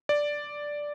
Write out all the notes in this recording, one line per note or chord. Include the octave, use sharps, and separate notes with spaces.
D5